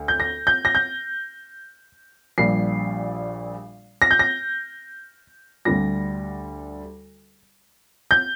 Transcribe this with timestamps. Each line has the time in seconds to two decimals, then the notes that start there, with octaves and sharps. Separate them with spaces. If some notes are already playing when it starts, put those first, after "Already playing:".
Already playing: D2
0.08 G6
0.20 A#6
0.47 G6
0.65 A#6
0.75 G6
2.38 A#1 A#2 G3 C7
4.02 A#6
4.11 G6
4.19 A#6
5.65 D2 D3 G3 A#6
8.11 G6